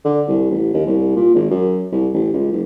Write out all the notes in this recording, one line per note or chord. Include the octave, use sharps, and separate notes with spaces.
D3
C2
A1
D#2
C2
A#2
G#1
F#2
C2
A1
C#2
F#1